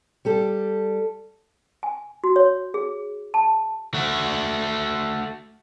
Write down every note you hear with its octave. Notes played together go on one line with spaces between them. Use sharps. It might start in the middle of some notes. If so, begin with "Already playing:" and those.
G3 G4 A4
G#5
F#4
C#5
G#4
A5
A3 F#4